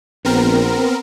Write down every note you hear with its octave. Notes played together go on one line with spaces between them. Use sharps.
A#1 B3 C4 A#4